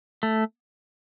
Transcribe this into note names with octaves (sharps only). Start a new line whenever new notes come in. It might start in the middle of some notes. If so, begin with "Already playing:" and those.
A3